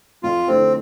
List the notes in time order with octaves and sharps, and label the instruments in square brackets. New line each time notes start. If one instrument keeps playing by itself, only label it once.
[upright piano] F2 [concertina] F4
[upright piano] D3 A3 E4 A4 [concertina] C4